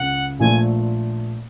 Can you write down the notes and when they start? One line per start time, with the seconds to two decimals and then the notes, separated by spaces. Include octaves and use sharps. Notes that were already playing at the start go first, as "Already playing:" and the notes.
Already playing: C#2 C#3 F#5
0.39 A#1 A#2 F3 A3 G#5